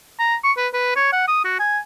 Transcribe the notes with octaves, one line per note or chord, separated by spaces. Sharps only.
A#5
C#6
B4
B4
C#5
F#5
D#6
F#4
G#5